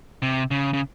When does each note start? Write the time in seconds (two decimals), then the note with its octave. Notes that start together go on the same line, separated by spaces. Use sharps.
0.22 C3
0.51 C#3
0.74 C#3